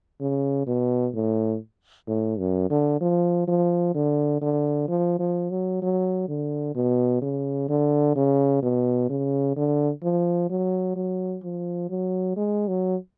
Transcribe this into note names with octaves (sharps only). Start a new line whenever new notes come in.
C#3
B2
A2
A2
F#2
D3
F3
F3
D3
D3
F3
F3
F#3
F#3
D3
B2
C#3
D3
C#3
B2
C#3
D3
F3
F#3
F#3
F3
F#3
G#3
F#3